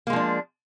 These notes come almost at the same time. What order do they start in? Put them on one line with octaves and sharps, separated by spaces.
A#3 G#3 F3 D4